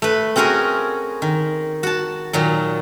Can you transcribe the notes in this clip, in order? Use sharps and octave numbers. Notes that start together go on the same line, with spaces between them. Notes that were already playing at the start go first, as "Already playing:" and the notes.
A3 B4
C4 C#4 F#4 G#4 A#4
D#3
F#4 A5
A#2 D#3 F#3